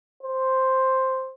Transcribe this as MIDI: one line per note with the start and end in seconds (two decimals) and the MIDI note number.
0.23 1.33 72